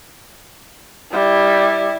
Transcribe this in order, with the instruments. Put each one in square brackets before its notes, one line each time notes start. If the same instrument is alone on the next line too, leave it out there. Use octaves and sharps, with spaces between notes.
[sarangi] G3 [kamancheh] E4